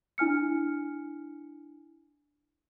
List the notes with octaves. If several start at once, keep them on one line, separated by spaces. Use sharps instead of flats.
D4 E4 G#5 F6 C#7